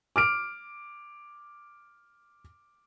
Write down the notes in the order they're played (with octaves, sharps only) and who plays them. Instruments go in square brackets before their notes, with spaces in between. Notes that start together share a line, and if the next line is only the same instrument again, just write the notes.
[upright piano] D6 F6 D7